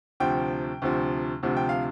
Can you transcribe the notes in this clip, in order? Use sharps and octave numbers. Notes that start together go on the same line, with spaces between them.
D2 C3 F3 G5
D2 C3 F3
D2 C3 F3
G5
F5